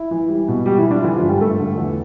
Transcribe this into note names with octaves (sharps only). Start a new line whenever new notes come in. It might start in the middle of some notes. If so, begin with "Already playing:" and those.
Already playing: E4
E3
G3
B2
G3 G4
E3 E4
G3
D4
F4
D3 E3 E4
F3 F4
G2
G3 G4
G2 A3 A4
D3
E2